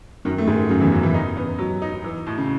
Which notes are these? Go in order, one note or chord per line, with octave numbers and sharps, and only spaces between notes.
F#2 D#3 F#3
A3
G#2 D#3 G#3
F#2 C#3 F#3
E2 E3
F#2 C#3 F#3
E2 E3
D#4
B3
F#3
D#4
E3
A2
C#3